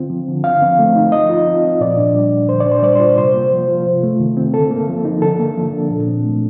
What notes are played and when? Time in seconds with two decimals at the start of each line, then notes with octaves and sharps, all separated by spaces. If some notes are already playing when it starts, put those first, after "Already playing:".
Already playing: D3 C4 F4
0.10 F3
0.28 D3
0.44 F3 F5
0.62 C4
0.79 A3
0.95 D#4
1.12 F3 D#5
1.29 F4
1.47 C4
1.64 F3
1.80 A#2 D5
1.97 D4
2.15 G3
2.32 A#2
2.49 D3 C5
2.60 D5
2.66 D4
2.72 C5
2.83 G3 D5
2.96 C5
3.00 F4
3.18 C3 C5
3.34 A#3
3.52 F3
3.68 F4
3.86 C3
4.03 A3
4.20 D#3
4.37 C4
4.53 D3 A4
4.70 A#3
4.89 F3
5.05 D#4
5.22 D3 A4
5.40 A#3
5.57 F3
5.73 D4
5.90 A#2
6.08 C4
6.24 A3